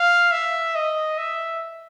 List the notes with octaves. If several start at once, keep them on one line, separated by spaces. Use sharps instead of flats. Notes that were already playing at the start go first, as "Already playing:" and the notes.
Already playing: F5
E5
D#5
E5